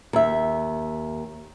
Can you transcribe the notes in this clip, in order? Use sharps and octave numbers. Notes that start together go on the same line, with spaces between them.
D#2 E5